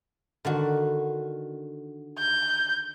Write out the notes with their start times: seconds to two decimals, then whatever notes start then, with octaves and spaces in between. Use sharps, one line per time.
0.45 D3 D#3 F#4
2.19 G6